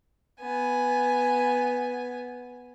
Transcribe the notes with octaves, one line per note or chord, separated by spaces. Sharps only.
B3 G#5